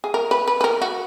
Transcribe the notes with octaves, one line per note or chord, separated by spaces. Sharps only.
G#4
A#4
B4
B4
B4
A#4
F#4